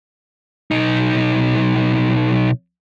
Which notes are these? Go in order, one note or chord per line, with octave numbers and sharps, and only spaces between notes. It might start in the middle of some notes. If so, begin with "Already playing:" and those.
B1 D#4